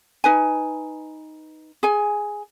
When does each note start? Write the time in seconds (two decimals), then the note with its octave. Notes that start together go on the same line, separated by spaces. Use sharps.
0.24 D#4 B4 G#5
1.83 G#4 G#5